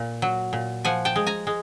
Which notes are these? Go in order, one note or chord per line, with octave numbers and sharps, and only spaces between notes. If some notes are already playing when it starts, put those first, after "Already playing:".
Already playing: A#2
F#3
A#2
F3 F#5 G#5
G5 A5
G#3
G#5 A#5
G#3